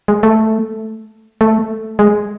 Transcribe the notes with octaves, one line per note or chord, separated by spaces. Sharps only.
G#3
A3
A3
G#3